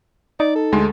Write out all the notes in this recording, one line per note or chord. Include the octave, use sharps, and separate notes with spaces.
D#4 D5
A4
D2 G#3 C6